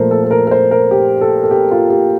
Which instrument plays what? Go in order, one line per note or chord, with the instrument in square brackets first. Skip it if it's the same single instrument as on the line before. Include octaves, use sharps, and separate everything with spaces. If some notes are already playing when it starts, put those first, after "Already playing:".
Already playing: [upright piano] A#2 F3 A3 A#4 C5
A4
A4
A#4
A#4
C5
A#4
G4
A4
A4
G4
F4
G4